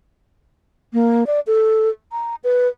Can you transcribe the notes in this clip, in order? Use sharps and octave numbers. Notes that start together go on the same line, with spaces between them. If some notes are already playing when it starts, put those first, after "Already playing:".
A#3
D5
A4
A#5
B4